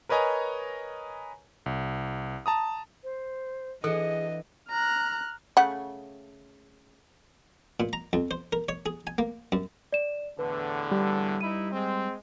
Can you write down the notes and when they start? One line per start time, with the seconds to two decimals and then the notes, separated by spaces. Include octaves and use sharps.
0.09 A#4 B4 C#5 D#5 G#5 A#5
1.66 C2
2.46 A5 A#5 D#6
3.03 C5
3.84 E3 D4 G#4 A4 D#5 F#5
4.70 A#5 F6 F#6
5.57 C#3 A3 F#5
7.80 A#2
7.93 A#5
8.13 F2
8.31 C5
8.53 A#4
8.69 C#5
8.86 G#4
9.07 G#5
9.18 A#3
9.52 F#2
9.92 D5 E7
10.39 E2 A2 D3 B4
10.92 G3
11.41 G2 D#4 E4 D#7
11.73 G#3 C4